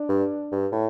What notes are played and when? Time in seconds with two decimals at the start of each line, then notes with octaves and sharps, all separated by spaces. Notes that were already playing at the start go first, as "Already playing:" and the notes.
Already playing: D4
0.09 G2
0.52 G2
0.72 A2